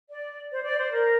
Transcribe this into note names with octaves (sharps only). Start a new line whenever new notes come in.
D5
C5
D5
C5
A#4